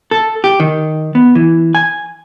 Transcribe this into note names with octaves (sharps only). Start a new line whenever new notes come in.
A4
G4
D#3
B3
E3
G#5